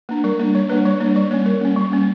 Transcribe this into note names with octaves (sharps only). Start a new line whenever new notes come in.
A#3 D4
G3 A#4
A#3 D4
G3 C#5
A#3 D4 B4
G3 C#5
A#3 D4
G3 D5
A#3 C#4 C#5
G3 A#4
A#3 C#4
G3
A#3 C#4